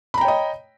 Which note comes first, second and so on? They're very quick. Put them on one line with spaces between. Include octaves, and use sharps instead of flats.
B5 A#5 G5 C#5 D#5